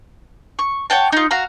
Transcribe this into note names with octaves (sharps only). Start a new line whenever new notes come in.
C#6
C#5 F#5 G5 A5
D#4 F4
F#4 F5 A#5